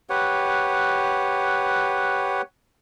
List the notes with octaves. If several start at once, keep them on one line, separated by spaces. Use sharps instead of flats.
G4 B4 C#5 F#5